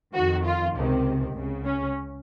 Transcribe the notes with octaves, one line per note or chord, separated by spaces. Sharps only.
F2 D#3 F#4
F4
C#2 C3 D#3
C#2 C#3
C#4